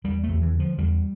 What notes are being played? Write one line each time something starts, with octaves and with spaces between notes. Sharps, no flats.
E2 G3
A3
E2
E3
D3
F3
E2 G3